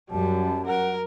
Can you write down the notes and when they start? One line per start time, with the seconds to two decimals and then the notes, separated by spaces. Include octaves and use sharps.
0.11 F#2 G3 A5
0.66 A#4 F#5